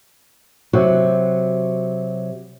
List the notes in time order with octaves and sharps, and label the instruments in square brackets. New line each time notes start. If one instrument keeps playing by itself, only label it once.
[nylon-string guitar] C3 F#3 F#4